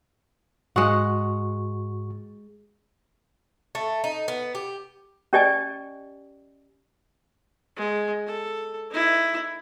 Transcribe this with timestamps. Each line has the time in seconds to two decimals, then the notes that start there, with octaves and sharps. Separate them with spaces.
0.76 G#2 G#3 F#4 F#5 C#6
3.75 A3
4.04 D#4
4.28 B3
4.55 G4
5.33 C#4 G4 D5 D#5 G#5
7.77 G#3
8.26 A4
8.91 D#4 E4